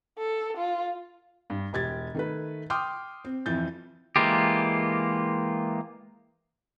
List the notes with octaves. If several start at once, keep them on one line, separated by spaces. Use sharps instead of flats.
A4
F4
G2
E1 G4 G#6 A6
D#3 A3 B4
G5 C6 D6 D#6 F6 G6
C4
F2 E3 F3 G6 A6
E3 G#3 A#3 F4 G4